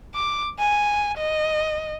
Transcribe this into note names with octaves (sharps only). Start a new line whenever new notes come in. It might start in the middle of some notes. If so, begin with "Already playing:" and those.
D6
G#5
D#5